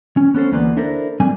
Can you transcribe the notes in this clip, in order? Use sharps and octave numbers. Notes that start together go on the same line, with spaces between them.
C#4
B3 C#4 A4 C5
D2 E3 A#3 B3 D5 C6
D4 E4 A4 A#4 C5 D5
C2 A#2 G3 C4 D4 G#5